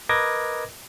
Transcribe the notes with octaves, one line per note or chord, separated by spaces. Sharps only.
A#4 B4 D#5 D6 G#6 A#6